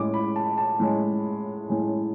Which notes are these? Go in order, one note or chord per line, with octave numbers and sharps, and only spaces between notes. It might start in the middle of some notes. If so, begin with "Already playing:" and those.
Already playing: A2 G#3 C#4 D6
B5
A5
A5
A2 G#3 C#4
A2 G#3 C#4